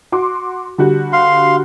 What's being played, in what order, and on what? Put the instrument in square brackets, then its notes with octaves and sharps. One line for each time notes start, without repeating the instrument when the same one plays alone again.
[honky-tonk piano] F#4 C6 D6
D3 G3 F#4
[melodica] F5 C6